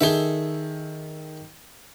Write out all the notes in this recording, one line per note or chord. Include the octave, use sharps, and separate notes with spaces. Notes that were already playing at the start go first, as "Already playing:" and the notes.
D#3 G#4 A4 E5 G7